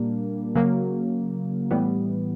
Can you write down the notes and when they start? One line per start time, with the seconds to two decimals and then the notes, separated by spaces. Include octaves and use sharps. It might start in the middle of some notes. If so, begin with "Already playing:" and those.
Already playing: A#2 G3 A#3 D4
0.55 C#3 F#3 A#3
1.71 A2 E3 G3 B3